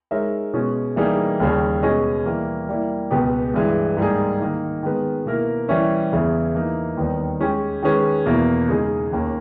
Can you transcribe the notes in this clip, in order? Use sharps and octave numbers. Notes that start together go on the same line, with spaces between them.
G#3 D#4 A#4 C#5 E5
B2 G#3 C#4
E3 G3 A#3 D#4 G#4
D#2 C#3 G3
B2 G#3 C#4 G#4 D#5
E3 G3 A#3
G3 A#3 E4
C#2 B2 G#3 B3 G4
G2 E3 G#3
G#2 G3 A#3 D#4 G#4
D#3 A#3 D#4
D#3 G#3 B3
B2 A#3 E4 A#4
E3 G3 C#4 E4
E2 C#3 E3
E3 A#3 D#4
D#2 D#3 G3 B3 D#4
G#3 C#4 G4
D#3 G#3 C#4 G#4 B4
E2 B2 A#3 E4
C#3 G#3 D#4 G#4 D#5
D#2 D#3 A#3 C#4